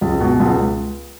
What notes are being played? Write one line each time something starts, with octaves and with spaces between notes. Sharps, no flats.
C#2
B2
C#2